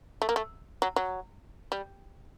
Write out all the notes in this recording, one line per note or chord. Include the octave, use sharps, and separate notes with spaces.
A3
A#3
A3
F#3
F#3
G3